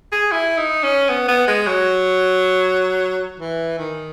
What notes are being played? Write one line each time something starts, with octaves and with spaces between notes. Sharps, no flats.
G#4
E4
D#4
C#4
B3
B3
G#3
F#3
E3
D#3